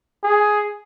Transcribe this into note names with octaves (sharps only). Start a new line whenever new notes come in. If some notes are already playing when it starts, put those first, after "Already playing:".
G#4